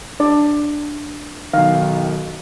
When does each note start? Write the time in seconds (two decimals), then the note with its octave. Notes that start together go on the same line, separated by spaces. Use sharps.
0.20 D4 D5
1.54 B1 D#3 F5